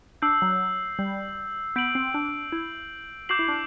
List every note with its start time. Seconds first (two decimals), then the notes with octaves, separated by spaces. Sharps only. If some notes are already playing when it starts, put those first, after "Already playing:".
0.22 D4 E6 G6 C7 F#7
0.42 F#3
0.99 G3
1.76 B3 G6 D7 F#7
1.95 C4
2.14 D4
2.52 E4
3.29 F#4 D6 G6 C7 F#7
3.39 E4
3.48 D4